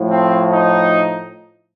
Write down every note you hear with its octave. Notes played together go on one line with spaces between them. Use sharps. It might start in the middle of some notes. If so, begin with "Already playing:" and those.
Already playing: A2 F3
C4
D#4